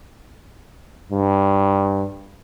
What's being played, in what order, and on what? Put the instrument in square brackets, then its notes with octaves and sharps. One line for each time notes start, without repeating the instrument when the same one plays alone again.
[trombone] G2